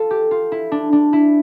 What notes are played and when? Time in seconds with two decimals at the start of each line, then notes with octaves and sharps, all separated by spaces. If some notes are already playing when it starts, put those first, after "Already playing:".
Already playing: F4 A4
0.10 G4
0.31 F4
0.52 E4
0.72 D4
0.93 D4
1.13 E4